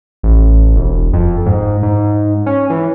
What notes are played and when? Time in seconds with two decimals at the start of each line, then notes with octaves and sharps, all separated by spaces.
0.23 A1
0.76 E1
1.13 F2
1.46 G#2
1.83 G#2
2.46 C#4
2.70 E3